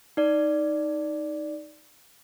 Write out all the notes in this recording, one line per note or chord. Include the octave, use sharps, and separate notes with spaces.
D#4 D5